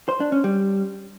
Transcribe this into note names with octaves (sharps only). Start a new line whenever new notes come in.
C5
D4
C#4
G3